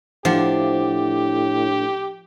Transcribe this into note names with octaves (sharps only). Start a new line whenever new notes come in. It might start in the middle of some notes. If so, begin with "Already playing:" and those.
A2 F3 D4 E4 G4 F#5